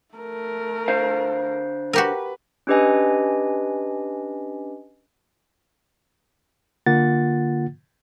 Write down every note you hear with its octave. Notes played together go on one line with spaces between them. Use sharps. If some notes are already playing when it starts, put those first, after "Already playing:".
A3 A#4
D3 C5 F5
F#4 G4 A#4 B4
C#4 D4 G4 B4 D#5 G#5
D3 A#3 F4 F#5 A6